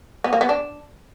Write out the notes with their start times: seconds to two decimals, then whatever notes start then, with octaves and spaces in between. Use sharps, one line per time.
0.24 B3
0.33 A#3
0.41 B3
0.49 D4